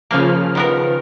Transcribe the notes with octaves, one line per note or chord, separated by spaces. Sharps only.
C#3 F3 A#3 F6
D#3 B3 A#4